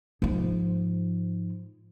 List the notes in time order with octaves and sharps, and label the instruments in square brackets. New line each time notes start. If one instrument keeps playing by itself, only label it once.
[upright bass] G#2 F3